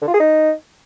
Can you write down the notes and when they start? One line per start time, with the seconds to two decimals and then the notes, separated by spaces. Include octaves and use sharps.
0.02 D3
0.08 F4
0.14 G#4
0.20 D#4